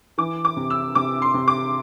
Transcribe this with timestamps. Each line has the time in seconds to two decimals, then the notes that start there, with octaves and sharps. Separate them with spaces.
0.18 E3 D6
0.45 D6
0.56 C3
0.70 E6
0.95 C3 D6
1.22 C6
1.34 C3
1.48 D6